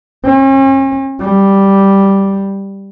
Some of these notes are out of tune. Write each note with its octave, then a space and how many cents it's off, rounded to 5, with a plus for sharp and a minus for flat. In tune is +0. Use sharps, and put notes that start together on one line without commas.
C#4 -45
G3 +0